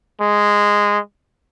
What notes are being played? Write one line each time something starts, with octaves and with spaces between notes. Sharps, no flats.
G#3